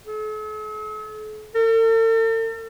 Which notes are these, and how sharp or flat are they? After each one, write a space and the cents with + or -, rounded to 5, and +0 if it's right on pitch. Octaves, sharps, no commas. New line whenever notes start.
A4 -45
A4 +45